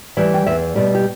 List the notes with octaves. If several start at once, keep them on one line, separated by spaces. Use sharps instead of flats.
E3 G3
G5
E2 E5
B2 G3 D5
G4